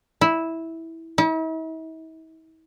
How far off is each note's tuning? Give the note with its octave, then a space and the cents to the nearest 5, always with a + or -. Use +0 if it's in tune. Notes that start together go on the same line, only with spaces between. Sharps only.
E4 -10
E4 -45